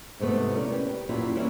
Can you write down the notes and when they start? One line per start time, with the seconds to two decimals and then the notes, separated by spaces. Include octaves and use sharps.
0.19 E2 G#2 C3 A3 B3
0.56 C#4 A#4 D5
0.72 G4 B4 G5
1.09 F#2 A#2 C#4 E4 F4 G4
1.35 E3 G3 A#3 C#4 E4